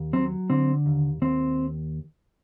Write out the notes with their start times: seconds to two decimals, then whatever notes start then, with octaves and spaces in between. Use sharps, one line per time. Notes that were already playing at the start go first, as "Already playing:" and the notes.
Already playing: D#2
0.13 F#3 C4
0.50 D3 C4
0.86 D#2
1.22 D#2 C4